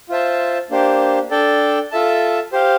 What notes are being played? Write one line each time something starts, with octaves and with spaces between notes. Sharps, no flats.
F4 C5 E5 A5
A#3 D4 G4 C5
D4 A4 D5 G5
F4 A4 E5 A5
G4 C5 F5